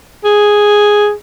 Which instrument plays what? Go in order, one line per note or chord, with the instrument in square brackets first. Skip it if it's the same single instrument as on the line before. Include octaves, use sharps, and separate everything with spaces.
[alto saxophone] G#4